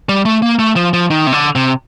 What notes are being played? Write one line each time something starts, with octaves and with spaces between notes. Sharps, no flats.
G3
A3
A#3
A3
F3
F3
D#3
C3
D3
C3